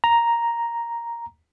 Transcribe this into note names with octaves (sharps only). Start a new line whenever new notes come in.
A#5